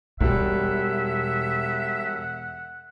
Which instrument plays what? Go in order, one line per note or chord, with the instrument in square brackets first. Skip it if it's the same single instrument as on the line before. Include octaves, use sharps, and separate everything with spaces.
[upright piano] E1 G3 [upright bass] E2 B2 [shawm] E5 [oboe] F#5